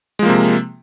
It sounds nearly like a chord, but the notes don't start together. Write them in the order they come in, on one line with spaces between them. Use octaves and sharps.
G#3 F3 A#3 C3